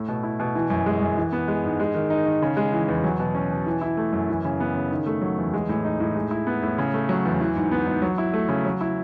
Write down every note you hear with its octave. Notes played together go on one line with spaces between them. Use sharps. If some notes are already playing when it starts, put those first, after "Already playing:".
Already playing: A2 A3
B2
E4
B2
E3
F#2
G#3
F#2
E3
B3
G#3
G#2
G#3
D#3
D#4
D#3
C#3
G#3
E3
E2
F#3
B2
C#4
B2
E3
E4
A3
F#2
E3
C#3
B3
C#3
D#3
A3
F#3
E2
G#3
A2
D#4
A2
G#3
E4
B3
A2
C#3
A3
F#3
E2
E3
G#2
B3
G#2
F#3
E4
A3
C#3
F#3
E4